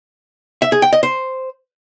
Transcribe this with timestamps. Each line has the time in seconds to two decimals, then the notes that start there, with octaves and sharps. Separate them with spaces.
0.62 E5
0.72 G#4
0.82 G5
0.93 D#5
1.03 C5